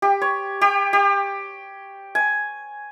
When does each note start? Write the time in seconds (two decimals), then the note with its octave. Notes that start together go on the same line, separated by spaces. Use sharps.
0.02 G4
0.22 C#5
0.61 G4
0.93 G4
2.15 G#5